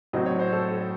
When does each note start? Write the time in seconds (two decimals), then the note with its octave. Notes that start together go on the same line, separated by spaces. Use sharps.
0.13 A2 F#3 C4 D#5
0.26 C#5
0.39 C5
0.52 A4 C#5